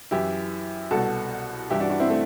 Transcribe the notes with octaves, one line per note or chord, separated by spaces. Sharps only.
F#2 E3 E4 G4
C2 B2 F#4 A4
G2 E3 E4 G4
D4 F#4
D4 F#4
C4 E4
A3